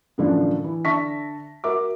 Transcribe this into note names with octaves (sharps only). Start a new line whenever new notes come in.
F#2 A2 D3 E3 F3 D4
E3
D3 E5 A5 C#6 A#6 B6
F#4 A#4 E5 D6